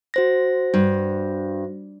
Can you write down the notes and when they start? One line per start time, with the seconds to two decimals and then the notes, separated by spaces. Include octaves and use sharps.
0.14 F#4 C5 A#6
0.74 G2